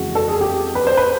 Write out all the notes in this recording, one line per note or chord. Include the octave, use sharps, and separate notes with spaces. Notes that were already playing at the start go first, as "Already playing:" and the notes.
Already playing: F2 C#3 E3 G#3 F#4
A4
G#4
G4
B4
C5
B4